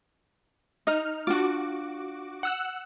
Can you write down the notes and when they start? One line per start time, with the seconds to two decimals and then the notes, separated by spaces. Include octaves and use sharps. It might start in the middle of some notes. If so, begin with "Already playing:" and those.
0.87 D#4 D#5 F6
1.27 D4 F4 F#4 D6
2.43 F#5 E6 F#6